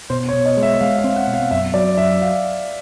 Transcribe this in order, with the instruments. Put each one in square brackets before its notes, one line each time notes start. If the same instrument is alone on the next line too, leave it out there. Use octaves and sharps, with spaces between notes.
[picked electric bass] B2 [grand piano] C5
[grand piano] C#5
[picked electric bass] B2
[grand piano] D#5
[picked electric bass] G#3
[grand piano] E5
[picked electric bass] G#3 [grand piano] F5
[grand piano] F5
[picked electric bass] C4
[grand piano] F#5
[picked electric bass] B2
[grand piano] F5
[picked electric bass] F#2 [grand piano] E5
[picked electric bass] F#3 [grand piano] D5
[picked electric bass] F#2 [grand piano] E5
[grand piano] F5